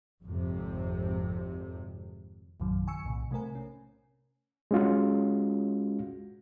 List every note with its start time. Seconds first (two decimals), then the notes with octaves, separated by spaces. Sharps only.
0.24 G#1 F2 C3
2.60 A#1 F#2 A2 C3 D#3 F#3
2.88 G#5 C#6 E6 C#7
3.04 B1 A2 C3
3.31 C3 A3 C4 A#4 G#5
3.55 C#4
4.71 G#3 C#4 F4 F#4